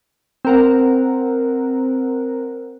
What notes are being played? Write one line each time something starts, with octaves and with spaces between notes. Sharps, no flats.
C4 A#4 F#5